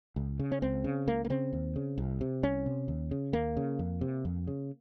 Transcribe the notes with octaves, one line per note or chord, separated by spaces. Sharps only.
C#2
C#3
C#4
C#2 C4
C#3
C#2 A#3
A#3
C#3 C4
D#2
C#3
C2
C3
C2 C#4
C3
D#2
C#3
D#2 A#3
C#3
F2
C3
F2
C#3